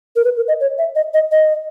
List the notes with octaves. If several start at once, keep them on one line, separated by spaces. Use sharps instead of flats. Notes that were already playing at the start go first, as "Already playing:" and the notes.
A#4
B4
A#4
D#5
C#5
E5
D#5
D#5
D#5